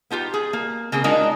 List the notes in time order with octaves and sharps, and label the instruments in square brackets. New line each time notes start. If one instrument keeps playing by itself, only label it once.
[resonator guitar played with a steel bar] B3 D#4 F4 G4
G#4
A#3
C#3 A#3 C4 G#4
G#3 D4 D#4 F4 F#4 A#4